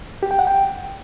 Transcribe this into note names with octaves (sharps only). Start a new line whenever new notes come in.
G4
G5
F#5
G5